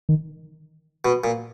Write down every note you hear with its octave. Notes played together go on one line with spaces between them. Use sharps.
D#3
B2
A#2